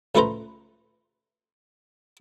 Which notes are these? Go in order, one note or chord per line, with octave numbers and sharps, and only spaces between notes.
C#2 A3 A4 B4 C5 A#5